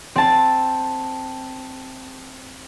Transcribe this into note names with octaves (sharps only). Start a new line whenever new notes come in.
C4 A5